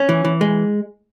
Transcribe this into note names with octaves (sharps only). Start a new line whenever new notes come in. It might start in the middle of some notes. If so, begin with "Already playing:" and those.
Already playing: C#4
E3
E3
G#3